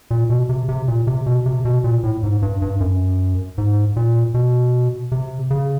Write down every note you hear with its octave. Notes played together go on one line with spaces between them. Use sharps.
A#2
B2
C3
C3
A#2
C3
B2
C3
B2
A#2
A2
G#2
G2
G2
F#2
G#2
A#2
B2
C3
C#3